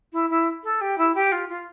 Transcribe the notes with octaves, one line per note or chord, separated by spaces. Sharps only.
E4
E4
A4
G4
E4
G4
F4
F4